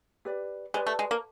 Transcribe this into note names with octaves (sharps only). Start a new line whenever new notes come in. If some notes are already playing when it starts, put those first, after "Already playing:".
G4 B4 D5
G#3 G4 B4 D5
A3
G#3
A#3